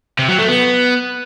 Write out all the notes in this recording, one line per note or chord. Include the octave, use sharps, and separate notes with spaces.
C3
F#3
A3
B3